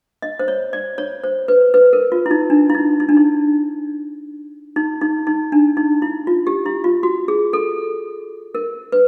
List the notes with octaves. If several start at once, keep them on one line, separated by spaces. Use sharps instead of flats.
D#5
C5
C#5
D5
C#5
C5
B4
B4
A#4
F4
E4
D#4
D4
E4
D#4
D#4
D4
D#4
D#4
D#4
D#4
D4
D#4
E4
F4
G4
E4
F4
F#4
G#4
A4
A#4
B4